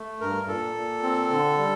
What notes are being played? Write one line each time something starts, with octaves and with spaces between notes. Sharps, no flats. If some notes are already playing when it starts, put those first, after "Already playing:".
Already playing: A3
G2 A#4
A#2 A4
A#2
C4
D3
G3